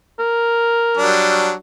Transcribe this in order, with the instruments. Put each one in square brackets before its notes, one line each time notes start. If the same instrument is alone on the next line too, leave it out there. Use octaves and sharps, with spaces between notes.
[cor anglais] A#4
[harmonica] F#3 G3 D4